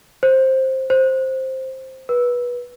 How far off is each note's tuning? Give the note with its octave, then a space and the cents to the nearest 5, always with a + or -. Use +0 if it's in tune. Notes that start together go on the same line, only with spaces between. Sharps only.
C5 +10
C5 +5
B4 -20